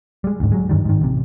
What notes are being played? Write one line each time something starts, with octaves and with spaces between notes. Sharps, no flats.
G3 G#3
D2 G#2
F#3 G#3
G2 D3 D#3 G3
G#2 D#3
A1 C3